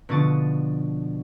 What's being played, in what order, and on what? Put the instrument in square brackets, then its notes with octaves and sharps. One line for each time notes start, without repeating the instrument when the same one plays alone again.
[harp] B2 D3 F3 C#6 D#6 A6